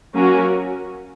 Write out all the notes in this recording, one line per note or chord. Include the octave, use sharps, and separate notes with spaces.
F#3 A#3 C#4 F#4 A#4